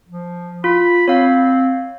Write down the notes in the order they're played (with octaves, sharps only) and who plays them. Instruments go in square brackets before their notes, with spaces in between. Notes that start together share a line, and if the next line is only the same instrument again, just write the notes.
[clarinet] F3
[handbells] F4 [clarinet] B5
[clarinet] C4 [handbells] C#5 F5